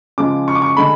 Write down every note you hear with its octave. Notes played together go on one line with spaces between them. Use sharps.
C#3 F3 G#3 D6
C#6
D6
C#6
D3 G#3 B5